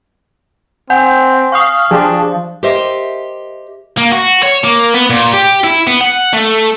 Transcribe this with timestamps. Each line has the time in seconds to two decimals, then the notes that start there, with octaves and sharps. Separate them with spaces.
0.90 C4 F#5 G#5 G6
1.52 F5 C#6 D#6
1.91 F3 D4 G4 G#4
2.63 G4 A#4 C5 D#5 E5
3.98 A#3
4.12 F#4
4.43 C#5
4.64 A#3
4.94 B3
5.10 A#2
5.34 G4
5.64 E4
5.87 B3
6.01 F#5
6.33 A3